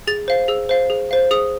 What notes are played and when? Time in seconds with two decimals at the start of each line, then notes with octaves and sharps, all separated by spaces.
0.07 G#4 A6
0.28 C5 F5
0.48 G#4 E6
0.69 C5 F5
0.90 G#4
1.11 C5 F5
1.31 G#4 D#6